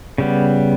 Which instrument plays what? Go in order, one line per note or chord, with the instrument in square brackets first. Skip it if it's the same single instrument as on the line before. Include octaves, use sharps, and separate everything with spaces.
[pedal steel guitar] C#3 G3 B3